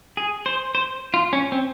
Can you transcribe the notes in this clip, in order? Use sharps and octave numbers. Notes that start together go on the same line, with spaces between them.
G#4
C5
C5
F4
C#4
C4